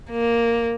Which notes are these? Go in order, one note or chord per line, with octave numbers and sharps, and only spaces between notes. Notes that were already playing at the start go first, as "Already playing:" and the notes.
A#3